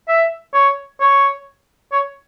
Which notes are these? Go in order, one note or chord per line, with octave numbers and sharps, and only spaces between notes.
E5
C#5
C#5
C#5